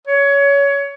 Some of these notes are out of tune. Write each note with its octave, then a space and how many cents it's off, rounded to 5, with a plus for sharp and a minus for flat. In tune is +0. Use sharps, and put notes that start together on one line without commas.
C#5 +20